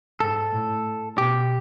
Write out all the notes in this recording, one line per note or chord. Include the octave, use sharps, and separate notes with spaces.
G#2 A4
A2
B2 G4